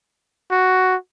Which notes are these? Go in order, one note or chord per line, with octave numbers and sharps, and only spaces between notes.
F#4